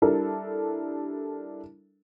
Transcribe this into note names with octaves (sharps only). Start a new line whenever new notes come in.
G3 D4 E4 A4 A#4